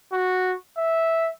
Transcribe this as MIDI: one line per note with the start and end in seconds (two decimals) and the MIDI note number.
0.13 0.54 66
0.78 1.30 76